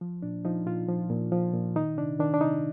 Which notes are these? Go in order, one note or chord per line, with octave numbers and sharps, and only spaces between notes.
F3
A#2 D4
F3 D#4
A#2 F4
F3
A#2
F3
A#2
D#3 D#4
C3 D4
D#3 D4
D4
C3 D#4